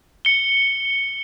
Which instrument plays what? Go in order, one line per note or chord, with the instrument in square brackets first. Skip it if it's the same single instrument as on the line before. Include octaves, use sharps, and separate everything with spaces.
[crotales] C#7 G7